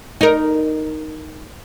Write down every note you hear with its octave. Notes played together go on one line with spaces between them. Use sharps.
D#4 A#4